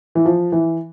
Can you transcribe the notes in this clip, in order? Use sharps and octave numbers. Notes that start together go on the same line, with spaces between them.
E3
F3
E3